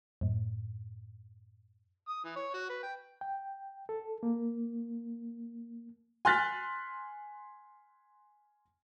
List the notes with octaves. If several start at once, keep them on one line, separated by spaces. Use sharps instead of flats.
F#2 A2
D#6
E3
C#5
F#4
B4
G5
G5
A4
A#3
G#5 C6 F6 F#6 A6 B6